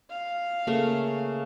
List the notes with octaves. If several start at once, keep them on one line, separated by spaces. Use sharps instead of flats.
F5
C#3 A3 A#3